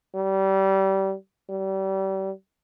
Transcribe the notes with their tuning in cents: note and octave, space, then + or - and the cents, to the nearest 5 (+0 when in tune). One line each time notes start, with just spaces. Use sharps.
G3 -25
G3 -35